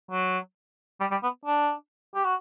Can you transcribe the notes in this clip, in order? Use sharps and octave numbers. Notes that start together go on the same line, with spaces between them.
F#3
G3
G3
B3
D4
G4
F#4